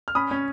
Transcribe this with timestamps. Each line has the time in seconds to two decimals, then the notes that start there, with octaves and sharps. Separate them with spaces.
0.08 F6
0.15 C#4 B5 D#6
0.31 C#4